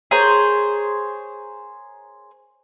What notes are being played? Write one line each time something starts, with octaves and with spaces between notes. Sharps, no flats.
G#4 A#4 C5 C#5